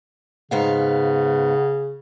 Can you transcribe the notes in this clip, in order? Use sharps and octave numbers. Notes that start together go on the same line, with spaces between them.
G#2 C#3 B3 F5